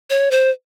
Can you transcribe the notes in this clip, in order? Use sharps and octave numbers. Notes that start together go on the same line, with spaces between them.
C#5
C5